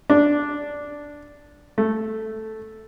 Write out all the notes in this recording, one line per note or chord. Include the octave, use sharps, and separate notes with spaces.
D4
A3